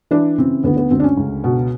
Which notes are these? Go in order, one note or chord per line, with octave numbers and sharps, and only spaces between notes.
E3 D4
C#3 C4
D2 B3
B3
D2 C4
D4
C#4
C#2
B2